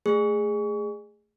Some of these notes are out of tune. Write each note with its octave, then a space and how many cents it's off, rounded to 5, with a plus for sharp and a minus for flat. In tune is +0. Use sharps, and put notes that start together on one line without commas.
A3 +0 G#4 -10